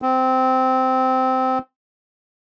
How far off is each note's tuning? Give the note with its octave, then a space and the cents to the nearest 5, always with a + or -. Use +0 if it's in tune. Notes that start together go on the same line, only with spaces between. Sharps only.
C4 -15